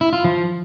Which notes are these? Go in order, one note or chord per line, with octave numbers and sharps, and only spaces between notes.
E4
F4
F3